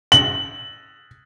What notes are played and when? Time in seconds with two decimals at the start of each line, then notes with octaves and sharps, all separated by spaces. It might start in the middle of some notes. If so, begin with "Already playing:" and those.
0.12 F#7